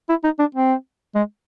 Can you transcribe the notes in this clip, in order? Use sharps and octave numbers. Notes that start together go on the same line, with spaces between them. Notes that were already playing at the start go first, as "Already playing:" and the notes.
E4
D#4
D4
C4
G#3